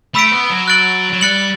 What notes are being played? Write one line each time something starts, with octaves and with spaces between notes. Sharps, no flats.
A3 B5 E6 B6 D7
B3
F#3
F#6 A6 D7 F#7
F#3
G3 F#6 A6 C#7 F#7